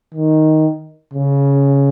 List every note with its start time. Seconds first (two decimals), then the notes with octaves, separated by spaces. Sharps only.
0.14 D#3
1.14 C#3